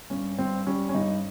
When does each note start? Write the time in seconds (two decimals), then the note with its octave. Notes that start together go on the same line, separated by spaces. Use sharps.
0.10 G2 C#4
0.38 G2 C4
0.67 G3 C#4
0.89 C#4
0.95 G2 D#4